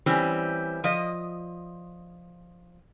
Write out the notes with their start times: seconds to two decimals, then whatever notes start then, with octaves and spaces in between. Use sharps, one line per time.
0.06 E3 G3 C4 C#4
0.84 F3 D#5